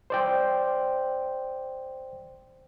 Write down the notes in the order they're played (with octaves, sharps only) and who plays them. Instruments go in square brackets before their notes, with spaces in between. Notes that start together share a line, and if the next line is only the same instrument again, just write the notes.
[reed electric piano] C5 D5 G5